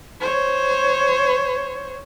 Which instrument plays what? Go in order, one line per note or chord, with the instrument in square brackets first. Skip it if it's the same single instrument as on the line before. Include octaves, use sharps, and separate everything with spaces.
[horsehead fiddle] C5 C#5